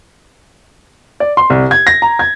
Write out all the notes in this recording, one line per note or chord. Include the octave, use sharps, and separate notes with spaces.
D5
C6
C2
G#6
A#6
A#5
G#6